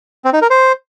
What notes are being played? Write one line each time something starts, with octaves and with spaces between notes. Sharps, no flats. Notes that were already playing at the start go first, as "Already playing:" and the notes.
C4
D#4
A#4
C5